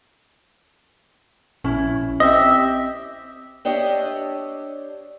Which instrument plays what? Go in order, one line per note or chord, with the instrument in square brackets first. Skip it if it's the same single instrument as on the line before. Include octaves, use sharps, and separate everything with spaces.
[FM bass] A#1 [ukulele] C#4 E4
[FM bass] C4 [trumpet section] G4 E5 [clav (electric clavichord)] D#5
[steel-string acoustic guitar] D4 G4 C#5 D#5 E5